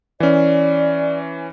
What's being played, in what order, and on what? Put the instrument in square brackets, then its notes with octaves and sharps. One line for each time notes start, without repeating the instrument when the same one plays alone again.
[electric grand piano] E3 C#4 [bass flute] D5